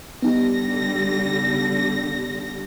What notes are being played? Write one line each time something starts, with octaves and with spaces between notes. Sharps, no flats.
D3 G3 B3 D#4 G4 A#6